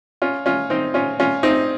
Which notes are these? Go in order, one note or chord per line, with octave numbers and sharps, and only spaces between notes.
C#4 F4
C#4 F4
C4 D#4
C#4 F4
C#4 F4
C4 D#4